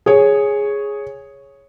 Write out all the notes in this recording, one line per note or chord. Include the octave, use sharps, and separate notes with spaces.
G#4 C#5